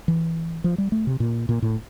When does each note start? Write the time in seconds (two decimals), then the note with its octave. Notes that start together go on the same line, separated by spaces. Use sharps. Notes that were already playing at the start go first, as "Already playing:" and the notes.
0.08 E3
0.64 F3
0.78 G3
0.92 A3
1.07 C3
1.20 A#2
1.49 A#2
1.62 A2